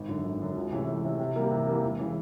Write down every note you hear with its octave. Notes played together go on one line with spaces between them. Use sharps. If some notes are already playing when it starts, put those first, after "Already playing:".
Already playing: G#1
F#2 D3 F#3
G#1
F#2 D3 F#3
C#2
C3 E3 A3 C#4
C#2
C3 E3 A3 C#4
C3
E3 G3 A#3
C3
E3 G3 A#3
E1
C#3 E3